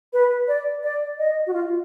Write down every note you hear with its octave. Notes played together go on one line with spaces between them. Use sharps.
B4
D5
D5
D#5
F#4
F4